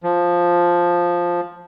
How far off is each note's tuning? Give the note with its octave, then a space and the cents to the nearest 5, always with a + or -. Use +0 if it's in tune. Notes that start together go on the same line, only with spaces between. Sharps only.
F3 +5